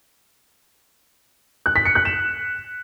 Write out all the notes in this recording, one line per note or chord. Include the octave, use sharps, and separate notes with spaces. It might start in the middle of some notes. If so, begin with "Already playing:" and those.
F#6
B6
C#7
F#6
E7